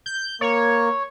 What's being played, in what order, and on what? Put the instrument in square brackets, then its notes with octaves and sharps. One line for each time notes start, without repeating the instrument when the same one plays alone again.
[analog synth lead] G6
[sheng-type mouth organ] A#3 [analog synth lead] C#5